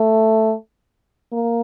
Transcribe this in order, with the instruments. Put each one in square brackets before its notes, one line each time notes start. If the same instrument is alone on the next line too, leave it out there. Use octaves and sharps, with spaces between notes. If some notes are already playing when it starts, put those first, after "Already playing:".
Already playing: [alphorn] A3
A#3